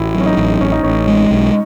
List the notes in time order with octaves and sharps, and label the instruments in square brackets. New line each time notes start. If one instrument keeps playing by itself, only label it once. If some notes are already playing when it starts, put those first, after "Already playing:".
Already playing: [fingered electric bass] A1 [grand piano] E4 F#4
[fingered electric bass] F#3
[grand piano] C#4
D#4
[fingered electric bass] A1
[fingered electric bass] A1 [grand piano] C#4
[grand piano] D#4
[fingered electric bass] A1 [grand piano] C#4
[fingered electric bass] G#3
B1